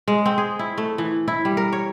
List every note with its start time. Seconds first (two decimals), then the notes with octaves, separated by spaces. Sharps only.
0.08 G#3
0.26 C4
0.38 G#4
0.59 E4
0.78 A3
0.98 E3
1.28 E4
1.45 G3
1.57 A#4
1.73 C#5